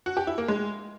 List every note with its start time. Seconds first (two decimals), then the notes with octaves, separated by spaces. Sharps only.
0.06 F#4
0.17 G4
0.27 E4
0.38 A#3
0.48 G#3